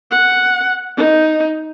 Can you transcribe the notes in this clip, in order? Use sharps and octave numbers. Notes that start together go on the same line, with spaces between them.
F#5
D#4